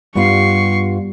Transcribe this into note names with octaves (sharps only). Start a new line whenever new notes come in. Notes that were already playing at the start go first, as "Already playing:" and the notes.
G2 G3 B3 F4 C#6 C7